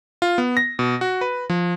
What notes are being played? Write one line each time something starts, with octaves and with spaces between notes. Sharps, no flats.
F4
B3
A#6
B2
F#4
B4
F3